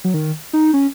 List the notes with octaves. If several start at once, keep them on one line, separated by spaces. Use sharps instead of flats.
F#3
D#3
D#4
C#4